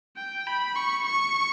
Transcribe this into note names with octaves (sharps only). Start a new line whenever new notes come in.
G5
B5
C#6
C#6